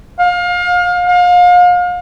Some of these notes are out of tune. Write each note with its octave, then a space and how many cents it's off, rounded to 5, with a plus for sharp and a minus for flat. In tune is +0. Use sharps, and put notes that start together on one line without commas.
F5 +30
F5 +35